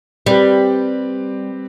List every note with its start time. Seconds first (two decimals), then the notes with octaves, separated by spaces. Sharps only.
0.26 G3 C4 G4 B4